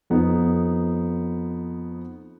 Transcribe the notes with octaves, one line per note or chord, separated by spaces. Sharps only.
F2 B3 D#4